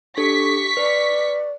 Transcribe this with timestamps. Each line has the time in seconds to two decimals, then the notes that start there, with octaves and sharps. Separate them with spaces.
0.17 D4 G4 A4 C#6 B6
0.77 B4 D5